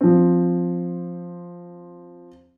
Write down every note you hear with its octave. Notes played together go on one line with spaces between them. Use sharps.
F3 C4